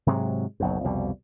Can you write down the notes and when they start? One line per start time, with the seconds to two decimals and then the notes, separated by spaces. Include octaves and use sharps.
0.06 G#2 C3 F#3 G#3
0.60 F#1 B1 F#2
0.84 C2 F2 B2 G3